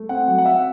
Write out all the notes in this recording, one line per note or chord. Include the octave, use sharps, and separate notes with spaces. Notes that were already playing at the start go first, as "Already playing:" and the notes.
Already playing: A3
C4 F#5
F#3
F#5
C4 E5